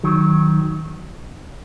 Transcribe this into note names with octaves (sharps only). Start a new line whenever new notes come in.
D#3 F#3